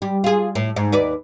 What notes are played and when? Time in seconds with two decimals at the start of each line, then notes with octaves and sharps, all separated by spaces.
0.02 G3
0.24 F4 G#4
0.55 A2
0.76 G#2
0.92 D#2 B4 D5